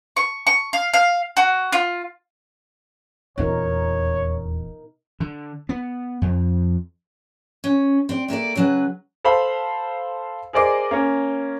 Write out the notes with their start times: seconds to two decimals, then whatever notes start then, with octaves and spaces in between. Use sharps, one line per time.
0.16 C#6
0.47 C#6
0.73 F5
0.94 F5
1.37 F#4
1.72 F4
3.38 D#1 E2 B2 D#4 A#4 C#5
5.20 D3
5.69 B3
6.22 F2
7.64 C#4
8.09 C4 D5
8.28 A3 A#3 A4 D5
8.55 C#3 F#3 B4
9.24 A4 C5 F5 B5
10.53 G#4 A#4 C5 D5 D#5 D6
10.91 A#3 C#4